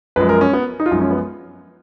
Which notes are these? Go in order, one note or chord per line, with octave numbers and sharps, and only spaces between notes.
F#2 F3 G#3 B4
A#4
C#4
B3
D#4
F4
F#2 F3 G#3 D#4
C#4
B3